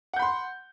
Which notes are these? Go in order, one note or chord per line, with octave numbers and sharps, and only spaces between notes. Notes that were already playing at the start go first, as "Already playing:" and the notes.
F#5 B5 C6 G6